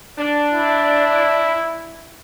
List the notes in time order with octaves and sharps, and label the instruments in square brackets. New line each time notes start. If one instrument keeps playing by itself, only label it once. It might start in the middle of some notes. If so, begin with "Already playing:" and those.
[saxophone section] D4
[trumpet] E4